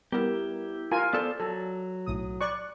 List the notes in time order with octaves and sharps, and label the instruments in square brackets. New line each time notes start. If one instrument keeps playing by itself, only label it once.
[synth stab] G3 B3 A#4 [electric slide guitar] E4 G4
[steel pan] F4 A#4 G#5
[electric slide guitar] B3 A4 C5 [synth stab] D5
[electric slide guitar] F#3 [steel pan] A4
[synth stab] B1 A2 D#6
[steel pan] D5 C#6 [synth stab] F#6